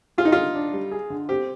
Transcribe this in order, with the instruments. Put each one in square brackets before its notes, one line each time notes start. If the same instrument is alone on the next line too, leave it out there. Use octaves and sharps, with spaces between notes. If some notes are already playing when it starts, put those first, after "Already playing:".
[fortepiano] F4 [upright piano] G#4
[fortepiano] D#4
[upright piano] D3 [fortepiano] F4
[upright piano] D4
G3
G#4
D3
[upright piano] C4 [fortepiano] G4